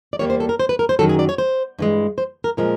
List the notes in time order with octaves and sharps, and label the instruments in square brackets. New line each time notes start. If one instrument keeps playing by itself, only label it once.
[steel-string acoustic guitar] D5
E2 B2 G3 A#3 C#5
C5
A4
A#4
C5
B4
A#4
C5
F#2 D#3 F#3 A4
G#4
D5
C#5
C5
G2 E3 G#3
C5
A#4
A#2 F3 G#3 A#4